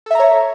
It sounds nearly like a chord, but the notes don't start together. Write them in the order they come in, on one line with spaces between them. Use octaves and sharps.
A4 E5 A#5 C#5